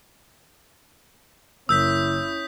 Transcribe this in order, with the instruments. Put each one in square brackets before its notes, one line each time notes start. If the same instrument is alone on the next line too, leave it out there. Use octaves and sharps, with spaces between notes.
[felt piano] F#1 [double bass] C#4 E4 [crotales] D#6 G6 B6 [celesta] E6